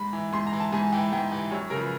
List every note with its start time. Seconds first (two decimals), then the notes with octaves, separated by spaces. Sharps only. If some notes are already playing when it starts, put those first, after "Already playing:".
Already playing: G#2 B5
0.13 E3
0.33 G#2 C6
0.47 A#5
0.53 E3
0.60 A5
0.72 G#2 G#5
0.92 E3 G5
1.13 G#2 G5
1.32 E3
1.51 F#2 C#5
1.70 C#3 A#4
1.76 F3
1.81 B4